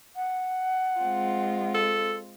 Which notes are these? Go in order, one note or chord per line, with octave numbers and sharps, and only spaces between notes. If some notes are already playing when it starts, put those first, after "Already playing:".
F#5
G#3 C4 F4
A4